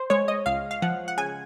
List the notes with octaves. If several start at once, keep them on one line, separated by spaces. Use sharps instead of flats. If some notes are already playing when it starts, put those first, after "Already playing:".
Already playing: C5
G#3 C#5
D#5
C#2 F5
F5
F3 F#5
F#5
C#3 G#5